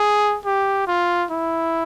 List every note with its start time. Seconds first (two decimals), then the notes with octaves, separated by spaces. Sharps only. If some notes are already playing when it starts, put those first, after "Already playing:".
Already playing: G#4
0.45 G4
0.87 F4
1.30 E4